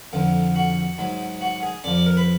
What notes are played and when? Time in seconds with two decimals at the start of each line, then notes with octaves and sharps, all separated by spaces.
0.13 F2 D3 F3
0.56 F#4
0.99 G#2 F#3
1.41 F#4
1.63 G#4
1.84 F2 F3 D5
1.95 D5
2.06 A#4
2.17 B4